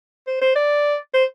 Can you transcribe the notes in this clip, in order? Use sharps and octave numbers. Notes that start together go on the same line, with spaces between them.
C5
C5
D5
C5